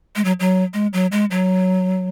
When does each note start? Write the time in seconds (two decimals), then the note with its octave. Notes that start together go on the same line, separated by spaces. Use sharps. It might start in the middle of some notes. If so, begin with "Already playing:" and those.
0.16 G#3
0.25 F#3
0.40 F#3
0.74 G#3
0.93 F#3
1.12 G#3
1.31 F#3